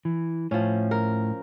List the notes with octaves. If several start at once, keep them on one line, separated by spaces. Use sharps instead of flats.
E3
A2 F3 C#4
A#4